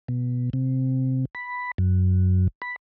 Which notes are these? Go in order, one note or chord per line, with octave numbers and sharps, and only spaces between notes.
B2
C3
B5
F#2
B5